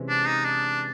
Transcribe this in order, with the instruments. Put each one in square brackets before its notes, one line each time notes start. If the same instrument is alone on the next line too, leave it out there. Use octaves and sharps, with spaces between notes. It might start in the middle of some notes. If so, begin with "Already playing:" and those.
Already playing: [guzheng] C3 E3 G#3 C#4
[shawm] D4
D#4
D4